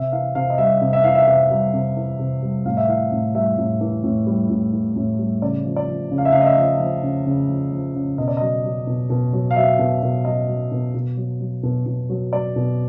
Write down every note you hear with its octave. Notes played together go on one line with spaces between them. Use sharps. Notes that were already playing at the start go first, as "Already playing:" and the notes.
Already playing: C3 E5
E3 F5
C3 F5
D#5
G3 E5
C3
E5
E3 F5
E5
C3 E5
G3
C3
E3
C3
G3
A2 F5
E5
E3 F5
A2
G3 E5
A2
E3
A2
G3
A2
E3
A2
G3
C#3 D5
F3
D5
F3
C#3
F5
E5
C#3 F5
D#5
E5
F3
F3
C#3
C#3
F3
F3
C#3
B2 D#5
D5
F#3 D#5
F#3
B2
B2
F#3
F5
F#3 E5
B2
B2
F#3 D#5
F#3
B2
B2
F#3
F#3
B2
B2
F#3
F#3 D5
B2